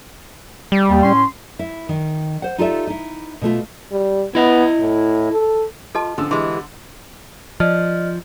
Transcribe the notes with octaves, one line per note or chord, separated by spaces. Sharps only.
G3
D#2
A2 C#4 C6
E4
D#3
C5 F#5
D#4 F4 G4 A4 D5 E5
D#4 E4
B2 A3 F4
G3
B3 E4 D#5
A2
A4
F4 A4 D#5 A5
D3 F3 C#4 E6
E3 G#3 G4 C6
F3 D5 D#5 F6